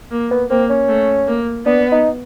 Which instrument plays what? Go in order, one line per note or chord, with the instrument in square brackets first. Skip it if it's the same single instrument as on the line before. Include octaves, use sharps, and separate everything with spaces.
[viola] A#3
[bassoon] B3
[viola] A#3 [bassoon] C4
[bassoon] C#4
[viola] A3
A#3
[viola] B3 [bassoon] D4
[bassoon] D#4